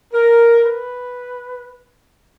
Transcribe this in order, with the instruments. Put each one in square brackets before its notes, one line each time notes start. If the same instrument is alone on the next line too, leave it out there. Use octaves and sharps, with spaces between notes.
[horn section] A#4
B4